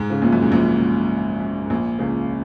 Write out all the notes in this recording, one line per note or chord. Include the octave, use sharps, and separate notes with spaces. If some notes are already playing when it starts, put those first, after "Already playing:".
Already playing: G#2
C#3
A#1 A#2
F#2
G#2
A#1 A#2
G#2
F#2
G#2
A#1 A#2
C#2 C#3